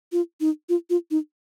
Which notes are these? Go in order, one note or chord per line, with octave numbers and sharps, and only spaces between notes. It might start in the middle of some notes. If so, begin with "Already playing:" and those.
F4
D#4
F4
F4
D#4